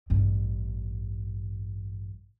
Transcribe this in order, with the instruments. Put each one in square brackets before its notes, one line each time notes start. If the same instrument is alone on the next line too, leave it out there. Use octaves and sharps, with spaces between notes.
[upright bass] A1 G2